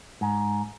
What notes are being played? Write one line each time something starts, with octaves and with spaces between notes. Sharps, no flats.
G#2